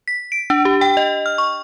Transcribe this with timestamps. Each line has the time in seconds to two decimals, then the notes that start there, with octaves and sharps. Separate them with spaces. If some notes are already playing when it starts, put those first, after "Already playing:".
0.08 B6
0.32 D7
0.50 D4
0.65 G4
0.81 G5
0.97 D#5
1.26 F6
1.38 C#6